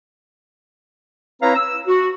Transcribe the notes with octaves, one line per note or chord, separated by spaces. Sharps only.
C4 E4 B4 C#5 F5 A#5
E6
F#4